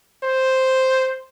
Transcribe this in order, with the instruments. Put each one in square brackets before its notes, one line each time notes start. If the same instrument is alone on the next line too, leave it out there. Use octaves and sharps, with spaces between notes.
[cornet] C5